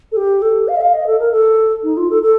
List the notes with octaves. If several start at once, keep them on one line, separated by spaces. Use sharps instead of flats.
A4
G4
A4
F5
D#5
F5
D#5
A4
A#4
A4
D#4
F4
A4
A4